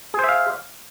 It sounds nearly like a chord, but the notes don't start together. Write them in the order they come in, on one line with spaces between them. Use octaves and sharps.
G#4 C5 E5 F5